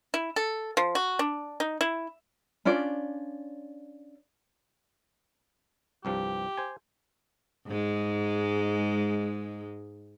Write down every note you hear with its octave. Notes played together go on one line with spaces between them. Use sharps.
E4
A4
F3
F#4
D4
D#4
E4
C#4 D4 F4 D5
C2 G2 F3 G4
C5 G#5
G#2 G#3